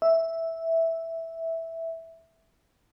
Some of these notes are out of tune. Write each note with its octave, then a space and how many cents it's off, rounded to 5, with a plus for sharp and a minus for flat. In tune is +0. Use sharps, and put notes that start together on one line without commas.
E5 -5